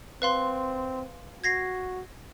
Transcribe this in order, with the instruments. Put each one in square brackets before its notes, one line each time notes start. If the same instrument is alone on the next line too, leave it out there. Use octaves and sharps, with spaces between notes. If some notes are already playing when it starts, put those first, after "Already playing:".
[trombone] C4 [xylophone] B4 F5 C6
[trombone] F#4 [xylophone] G#6 A#6 C7